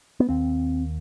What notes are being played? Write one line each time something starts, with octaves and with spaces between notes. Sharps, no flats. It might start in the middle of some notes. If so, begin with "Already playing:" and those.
B3
D#2 C4